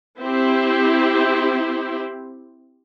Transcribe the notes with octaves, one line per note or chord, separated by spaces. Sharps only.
C4 E4 G4 C5